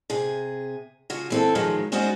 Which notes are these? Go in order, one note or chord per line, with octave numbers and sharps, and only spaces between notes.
C3 G#4
C#3 F4 F#4
E3 C4 A4
G#2 D#3 F3 F#3 G#3
G#3 C#4 D#4 F#4 C5 D5